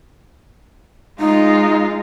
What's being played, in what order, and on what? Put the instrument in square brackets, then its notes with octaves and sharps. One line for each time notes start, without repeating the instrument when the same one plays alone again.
[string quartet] G#3 F4 [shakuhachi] D#4